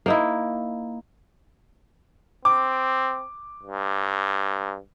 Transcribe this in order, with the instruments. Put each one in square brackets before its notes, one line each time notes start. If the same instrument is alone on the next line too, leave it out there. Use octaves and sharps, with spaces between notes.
[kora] A#3 D#4 E4
[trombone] C4 [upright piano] D6
[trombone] G2